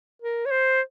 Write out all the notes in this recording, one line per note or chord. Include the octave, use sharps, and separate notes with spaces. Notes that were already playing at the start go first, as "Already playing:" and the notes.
A#4
C#5
C5